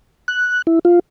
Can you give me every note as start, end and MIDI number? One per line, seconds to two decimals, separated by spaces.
0.28 0.62 90
0.67 0.79 64
0.85 0.99 65